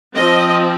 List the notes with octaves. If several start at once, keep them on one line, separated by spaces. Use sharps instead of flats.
F3 C4 D#5